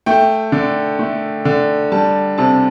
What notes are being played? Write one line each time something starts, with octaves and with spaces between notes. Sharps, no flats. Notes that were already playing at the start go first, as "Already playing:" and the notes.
A3 G5
D3
A3
D3
G3 A5
C3 A5